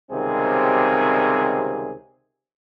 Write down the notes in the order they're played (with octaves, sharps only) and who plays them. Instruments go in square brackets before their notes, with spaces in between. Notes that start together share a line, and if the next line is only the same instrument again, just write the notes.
[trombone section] C#2 C3 D#3 G3 C4 G#4